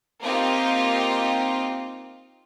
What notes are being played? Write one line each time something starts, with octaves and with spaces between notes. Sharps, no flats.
A#3 C4 D#4 F4 G4